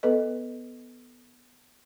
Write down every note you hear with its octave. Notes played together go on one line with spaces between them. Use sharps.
B3 A4 B4 D#5